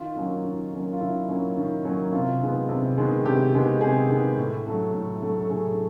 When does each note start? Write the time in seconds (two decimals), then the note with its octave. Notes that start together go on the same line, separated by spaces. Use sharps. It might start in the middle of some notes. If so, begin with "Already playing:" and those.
Already playing: D#3 F4
0.16 F#3 A#3 C#4
0.45 D#3
0.73 F#3 A#3 C#4
0.92 F4
1.01 D#3 E4
1.29 F#3 A#3 C#4
1.57 D#3
1.85 F#3 A#3 C#4
2.13 C3 F4
2.41 D#3 G#3 B3
2.69 C3
2.97 D#3 G#3 B3
3.25 C3 G4
3.53 D#3 G#3 B3
3.81 C3 G#4
4.09 D#3 G#3 B3
4.38 A2
4.66 F#3 A3
4.94 A2
5.21 F#3 A3
5.40 A4
5.50 A2 G#4